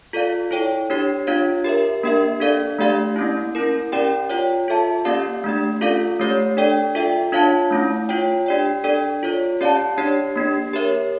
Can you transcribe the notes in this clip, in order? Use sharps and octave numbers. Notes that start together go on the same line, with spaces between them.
F4 A4 D5 F5
E4 A4 C#5 G5
D4 G4 C#5
D4 F4 C#5 F5
G4 A#4 E5
A#3 D4 G4 A#4 E5
D4 A4 D5 F5
A3 D4 G4 D5 F5
A#3 C#4 E4
C#4 E4 A#4
C#4 G4 A#4 D5 G5
F4 C#5 G5
F4 A4 E5 A5
A#3 C#4 G4 D5 F5
A3 D4 G4
C#4 F4 A4 D5 F5
A3 C#4 G4 C#5
D4 A4 D5 G5
F4 A4 E5 G5
D4 F4 C#5 F5 A5
A3 C#4 E4
F4 C#5 G5
D4 G4 D5 G5
D4 A4 D5 G5
F4 A4 C#5
C#4 G4 D5 F5 A5
D4 G4 C#5
A#3 D4 G4
G4 A#4 C#5 E5